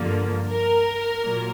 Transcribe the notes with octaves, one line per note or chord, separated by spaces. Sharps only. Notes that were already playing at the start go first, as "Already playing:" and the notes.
Already playing: G2 D3 F3 A#3
A#4
A#2 F#3 A#3